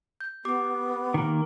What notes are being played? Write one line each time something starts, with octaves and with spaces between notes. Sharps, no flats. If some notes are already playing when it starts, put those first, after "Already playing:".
G6
B3 G4 D6
D#3 A#3